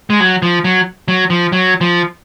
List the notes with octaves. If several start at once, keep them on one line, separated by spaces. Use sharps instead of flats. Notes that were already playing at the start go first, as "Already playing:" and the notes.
G#3
F#3
F3
F#3
F#3
F3
F#3
F3